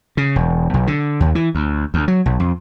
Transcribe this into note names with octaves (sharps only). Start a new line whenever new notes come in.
C#3
E1
B1
D3
D#2
E3
D2
D2
F#3
B1
F2